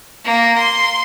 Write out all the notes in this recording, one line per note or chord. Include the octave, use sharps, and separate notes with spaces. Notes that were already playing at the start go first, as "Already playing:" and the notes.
A#3
C6